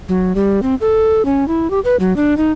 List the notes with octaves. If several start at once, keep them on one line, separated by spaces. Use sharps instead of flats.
F#3
G3
C4
A4
C#4
E4
G4
B4
F#3
D4
D#4